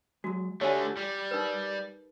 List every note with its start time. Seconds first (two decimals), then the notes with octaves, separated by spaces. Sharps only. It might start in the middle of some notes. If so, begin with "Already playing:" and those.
0.24 F#3 G#3 F#4
0.61 D3 A3 G4 C#5 D5 G#5
0.97 G3
1.31 D#4 A#4 B4